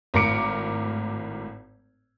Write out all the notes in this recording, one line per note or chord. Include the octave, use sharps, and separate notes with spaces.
G#1 A2 A#4 D6 C#7 D7